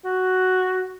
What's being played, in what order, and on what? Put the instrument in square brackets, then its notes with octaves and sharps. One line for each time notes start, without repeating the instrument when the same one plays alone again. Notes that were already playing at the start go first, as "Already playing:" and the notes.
[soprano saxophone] F#4